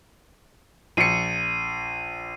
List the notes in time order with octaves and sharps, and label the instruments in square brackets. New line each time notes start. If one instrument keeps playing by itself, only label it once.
[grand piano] A#1 C#7 [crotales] C7 D#7